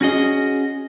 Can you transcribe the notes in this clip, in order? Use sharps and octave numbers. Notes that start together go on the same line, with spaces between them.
C#4 F#4 G#4 D#5